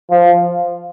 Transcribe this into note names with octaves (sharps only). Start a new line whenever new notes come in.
F3